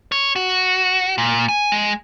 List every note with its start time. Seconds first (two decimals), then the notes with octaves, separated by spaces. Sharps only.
0.12 C#5
0.36 F#4
1.18 A#2
1.48 G#5
1.72 G#3